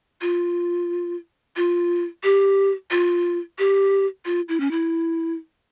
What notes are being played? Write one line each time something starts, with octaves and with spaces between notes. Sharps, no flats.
F4
F4
G4
F4
G4
F4
E4
C#4
E4